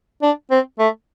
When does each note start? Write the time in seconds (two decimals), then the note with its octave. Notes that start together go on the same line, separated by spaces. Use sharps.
0.22 D4
0.51 C4
0.79 A3